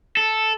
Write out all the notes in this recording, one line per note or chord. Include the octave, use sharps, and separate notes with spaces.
A4